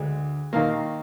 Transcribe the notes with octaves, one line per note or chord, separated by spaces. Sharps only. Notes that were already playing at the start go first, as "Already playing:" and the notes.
Already playing: D2 D3 G#3
D#2 D#3 A#3 F5